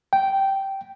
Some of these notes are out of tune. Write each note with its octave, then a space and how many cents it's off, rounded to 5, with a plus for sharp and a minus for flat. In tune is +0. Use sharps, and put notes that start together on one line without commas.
G5 -10